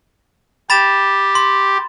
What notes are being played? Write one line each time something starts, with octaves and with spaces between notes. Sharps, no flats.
G4 B5 A6 E7
C6